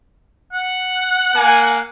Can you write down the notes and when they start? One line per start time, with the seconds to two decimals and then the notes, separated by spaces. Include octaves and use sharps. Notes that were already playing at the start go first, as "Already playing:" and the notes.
0.53 F#5
1.34 A#3 G#5